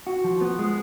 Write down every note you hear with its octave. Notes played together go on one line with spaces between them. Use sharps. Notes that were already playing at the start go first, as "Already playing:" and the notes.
F#4
F3
B3
G#3